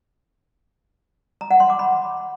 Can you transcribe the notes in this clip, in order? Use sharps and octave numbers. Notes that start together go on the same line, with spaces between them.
A#5
F#5
C6
D6
B5